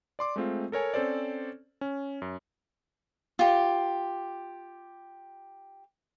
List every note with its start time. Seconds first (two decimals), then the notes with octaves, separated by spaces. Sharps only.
0.19 D5 C6 D6
0.36 G#3 A3 C4 F4
0.72 A4 A#4 C#5 G#5
0.94 C4 C#4 A4 C5 D5
1.81 C#4
2.22 F#2
3.39 F4 G4